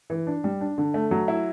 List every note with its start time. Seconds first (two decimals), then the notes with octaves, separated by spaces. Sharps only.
0.10 E3
0.27 D4
0.44 G3
0.61 D4
0.78 D3
0.94 A3
1.11 F#3
1.28 E4